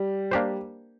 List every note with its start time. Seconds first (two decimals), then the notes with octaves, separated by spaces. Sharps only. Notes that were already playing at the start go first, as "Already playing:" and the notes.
Already playing: G3
0.31 A#3 D4 G4 C5